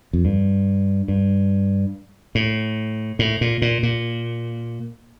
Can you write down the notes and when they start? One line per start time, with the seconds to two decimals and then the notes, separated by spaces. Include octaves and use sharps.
0.13 F2
0.25 G2
1.08 G2
2.35 A2
3.19 A2
3.41 A#2
3.62 A#2
3.83 A#2